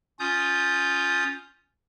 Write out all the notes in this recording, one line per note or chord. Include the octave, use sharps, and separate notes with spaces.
C#4 F4 D#6 G6